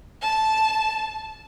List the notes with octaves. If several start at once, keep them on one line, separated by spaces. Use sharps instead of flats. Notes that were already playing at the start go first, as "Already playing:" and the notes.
A5